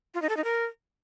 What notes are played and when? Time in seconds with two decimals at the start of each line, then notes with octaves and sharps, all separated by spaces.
0.14 F4
0.22 D#4
0.29 A4
0.37 D#4
0.44 A#4